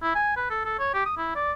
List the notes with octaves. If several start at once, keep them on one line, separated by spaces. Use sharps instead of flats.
E4
G#5
B4
A4
A4
C#5
G4
D#6
E4
D5